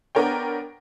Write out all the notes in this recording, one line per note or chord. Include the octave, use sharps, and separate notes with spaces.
B3 D4 A#4 C#5 G5